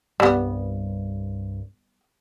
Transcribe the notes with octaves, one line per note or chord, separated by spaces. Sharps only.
C2 G2 G3 B3